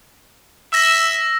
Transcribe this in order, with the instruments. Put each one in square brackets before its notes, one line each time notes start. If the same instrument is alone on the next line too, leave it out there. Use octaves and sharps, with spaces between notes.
[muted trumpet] E5 [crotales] E6 A#6